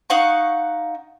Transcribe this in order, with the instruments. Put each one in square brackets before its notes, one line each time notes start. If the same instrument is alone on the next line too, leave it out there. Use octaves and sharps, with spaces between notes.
[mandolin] D#4 F5 F#5 C#6